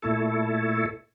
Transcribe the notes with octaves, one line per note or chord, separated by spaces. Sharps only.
A#2 A3 E4 A4